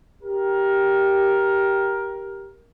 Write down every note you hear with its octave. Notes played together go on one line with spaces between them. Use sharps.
G4 A#4